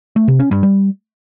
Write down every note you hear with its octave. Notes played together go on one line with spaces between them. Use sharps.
A3
C3
C#4
G2
G3